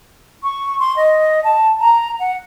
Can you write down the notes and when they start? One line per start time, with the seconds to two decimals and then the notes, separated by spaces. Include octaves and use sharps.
0.43 C#6
0.78 C6
0.97 D#5
1.43 A5
1.78 A#5
2.18 F#5